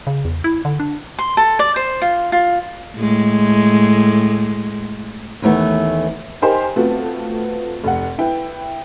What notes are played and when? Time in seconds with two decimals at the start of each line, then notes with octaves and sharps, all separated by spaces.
0.07 C#3
0.25 E2
0.44 E4
0.65 D3
0.80 D4
1.18 C6
1.37 A4
1.59 D5
1.76 C5
2.02 F4
2.32 F4
2.97 A2 G#3
5.42 D#2 E3 A3 B3
6.42 D#4 G4 A#4 C5 G#5 C6
6.76 A3 B3 C4 F4 F#4
7.84 F1 F#5
8.18 E4 B4 G5